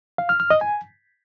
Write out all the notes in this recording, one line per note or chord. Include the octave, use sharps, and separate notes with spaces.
F5
F6
F6
D#5
G#5